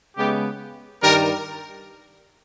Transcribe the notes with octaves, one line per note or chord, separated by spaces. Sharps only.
C#3 G#3 B3 G4
G2 D#3 G3 A#4